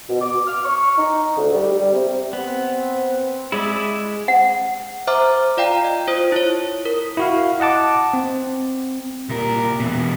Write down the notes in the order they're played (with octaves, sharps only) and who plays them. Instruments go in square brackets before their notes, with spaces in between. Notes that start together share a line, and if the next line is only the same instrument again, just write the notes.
[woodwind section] B2
D6
F6
C#6
D#4
D2
G3
G3
C3
[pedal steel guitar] B3 [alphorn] C4
[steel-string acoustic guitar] G#3 [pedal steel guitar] E4 D5 E5
[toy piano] F#5
[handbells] C5 E5 A#5 D6 F6
F4 D5 F5 G5 A#5
D#5
F4 C5 D#6
E4 C#5
A#4
[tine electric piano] E4 F#4 F5
D#5 F#5 A5 D6
C4
[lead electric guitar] C2 A#4 [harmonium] A#2 G4
[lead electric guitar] E2 B2